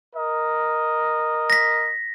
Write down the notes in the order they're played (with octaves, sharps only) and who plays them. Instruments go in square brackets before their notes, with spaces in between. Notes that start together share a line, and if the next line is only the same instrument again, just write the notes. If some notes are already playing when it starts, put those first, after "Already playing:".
[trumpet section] A#4 D#5
[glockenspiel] A#6 B6